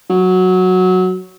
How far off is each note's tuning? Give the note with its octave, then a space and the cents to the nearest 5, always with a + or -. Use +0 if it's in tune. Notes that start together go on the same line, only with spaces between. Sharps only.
F#3 -5